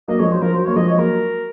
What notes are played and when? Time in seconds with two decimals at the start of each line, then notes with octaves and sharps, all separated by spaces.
0.08 F#3 A#3 D#5
0.19 F3 G#3 C#5
0.31 F#3 C5
0.42 F3 A#4
0.54 F#3 C5
0.64 A#3 C#5
0.76 F3 G#3 D#5
0.87 C#5
0.98 F#3 A#3 A#4